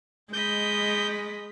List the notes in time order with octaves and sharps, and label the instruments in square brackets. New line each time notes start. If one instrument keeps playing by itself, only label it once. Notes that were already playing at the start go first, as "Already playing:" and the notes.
[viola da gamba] G#3 [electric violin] D#5 B5 [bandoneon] G6